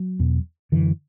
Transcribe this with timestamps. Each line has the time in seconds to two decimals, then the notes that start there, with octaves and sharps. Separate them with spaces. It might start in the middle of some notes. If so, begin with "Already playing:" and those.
Already playing: F#3
0.19 E2 B2
0.72 F#2 D3 E3